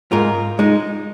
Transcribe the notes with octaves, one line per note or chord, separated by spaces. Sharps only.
G#2 F4 A#4
G#3 D#4